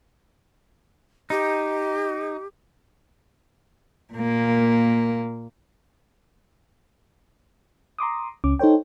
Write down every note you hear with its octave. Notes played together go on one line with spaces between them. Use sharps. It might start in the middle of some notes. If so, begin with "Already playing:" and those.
D#4 G4
A#2 A#3
A#5 C6 D6 D#6
C#2 C#4 D6
D#4 A4 C5 C#5 G5